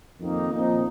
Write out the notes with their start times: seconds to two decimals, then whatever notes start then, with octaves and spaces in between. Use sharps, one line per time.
0.20 F2 D#3 A#3 D#4
0.51 A#2 F3 C4 D#4